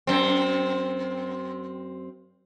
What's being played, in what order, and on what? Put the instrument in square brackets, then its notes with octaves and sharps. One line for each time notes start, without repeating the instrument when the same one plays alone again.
[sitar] F#2 C4